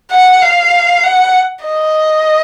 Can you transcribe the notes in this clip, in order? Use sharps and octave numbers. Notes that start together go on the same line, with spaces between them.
F#5
F5
F#5
D#5